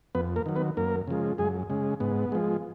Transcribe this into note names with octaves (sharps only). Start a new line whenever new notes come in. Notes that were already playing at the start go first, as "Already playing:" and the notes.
F2 B3 B4
A#3 A#4
D#3 F#3
B3 B4
F#2 A#3 A#4
C#3 F3 G#3
F#2 G#3 G#4
C#3 G#3
G#2 B3
F3 G#3